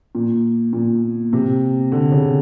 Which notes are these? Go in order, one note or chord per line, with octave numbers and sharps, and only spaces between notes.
A#2
A#2
C3
D3
C#3